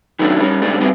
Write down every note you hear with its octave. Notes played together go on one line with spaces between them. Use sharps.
D#3 F#3 A3 C#4 D4
G3 C#4
G#2 C#3 G3 A3 D4
G3 A3 B3 C4 E4 G4